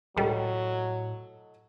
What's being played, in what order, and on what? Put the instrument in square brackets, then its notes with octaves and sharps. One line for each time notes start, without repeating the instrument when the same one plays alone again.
[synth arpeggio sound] C#2 G3 [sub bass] A2 [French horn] F#3 [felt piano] A4 D#5